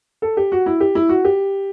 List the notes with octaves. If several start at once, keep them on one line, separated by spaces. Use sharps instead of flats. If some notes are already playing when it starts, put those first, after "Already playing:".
A4
G4
F#4
E4
G4
E4
F#4
G4